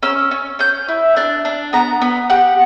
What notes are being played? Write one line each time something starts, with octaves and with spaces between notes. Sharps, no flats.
C#4 E6
C#4
C#4 G6
E4
D4 F#6
D4
B3 A#5
B3
G4 F#5